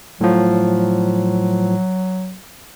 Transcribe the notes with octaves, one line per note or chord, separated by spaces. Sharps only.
A2 F3 F#3